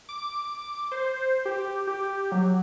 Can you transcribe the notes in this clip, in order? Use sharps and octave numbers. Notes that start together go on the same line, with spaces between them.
D6
C5
G4
G4
F#3